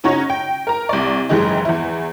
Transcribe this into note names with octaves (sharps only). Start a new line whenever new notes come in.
C#3 C#4 D#4 F#4 C#5 A#6
G5
A#4 A#5
C2 D5
F#1 G#2 E3 G#3 G4 D#5
E2 E4